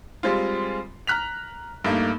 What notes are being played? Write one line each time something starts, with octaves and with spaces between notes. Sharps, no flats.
G3 G#3 C4 F4
A#5 F6 F#6 B6 F7
G2 A3 A#3 D#4